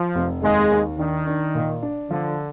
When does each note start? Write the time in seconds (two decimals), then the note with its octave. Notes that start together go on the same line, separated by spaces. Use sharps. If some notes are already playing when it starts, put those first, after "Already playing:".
Already playing: F3
0.15 F1
0.43 D#2 G#3
0.70 D#2
0.99 D#3 D4
1.27 D4
1.55 A#2
1.82 D4
2.10 D3 F3